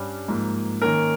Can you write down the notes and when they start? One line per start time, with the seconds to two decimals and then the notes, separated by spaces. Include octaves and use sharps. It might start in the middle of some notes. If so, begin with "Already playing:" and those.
Already playing: G2 G3 C#4
0.28 G#2 F3 A#3
0.82 D#3 A#3 C#4 A#4